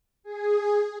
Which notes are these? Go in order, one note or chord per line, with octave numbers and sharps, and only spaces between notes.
G#4